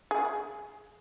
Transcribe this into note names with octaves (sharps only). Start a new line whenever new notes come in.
G#4